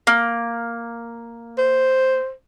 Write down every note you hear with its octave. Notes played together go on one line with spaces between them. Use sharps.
A#3
C5